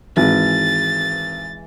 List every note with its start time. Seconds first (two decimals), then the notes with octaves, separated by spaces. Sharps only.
0.17 G#1 E3 G#3 A6